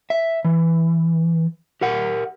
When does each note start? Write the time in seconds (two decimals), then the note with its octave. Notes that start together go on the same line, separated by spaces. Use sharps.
0.10 E5
0.45 E3
1.81 G4 A#4 F#5